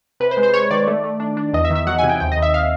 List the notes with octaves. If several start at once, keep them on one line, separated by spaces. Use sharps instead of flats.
C3 B4
C5
G#3
C5
G#3 C#5
D#3 D5
A3
A3
D4
D4
E2 D#5
E5
D#3
E5
F#3 F#5
C3 G#5
G5
D#2 G5
D#5
D#2
E5
F5